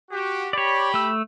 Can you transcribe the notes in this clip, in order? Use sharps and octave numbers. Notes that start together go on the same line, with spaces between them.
F#4 G4
G4 C#5 D5 B5
A3 E6